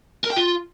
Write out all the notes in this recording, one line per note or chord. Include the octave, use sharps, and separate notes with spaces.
A#4
G5
F4